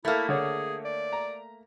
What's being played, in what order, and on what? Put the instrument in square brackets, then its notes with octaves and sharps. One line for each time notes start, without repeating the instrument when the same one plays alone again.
[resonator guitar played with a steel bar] A3 A#3 [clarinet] E4 [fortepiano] A4 E5
[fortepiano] D3 C#5 [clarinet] G#4
[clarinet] D5
[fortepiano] A#5